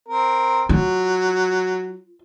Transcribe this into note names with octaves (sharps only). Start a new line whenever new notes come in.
C4 A#4
F#3 F4